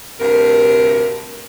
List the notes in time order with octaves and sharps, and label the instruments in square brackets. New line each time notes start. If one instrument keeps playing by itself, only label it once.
[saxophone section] D2 G2 C3 A#4